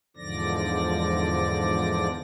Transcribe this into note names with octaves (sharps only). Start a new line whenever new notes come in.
E2 G#2 D3 F3 D5 A#6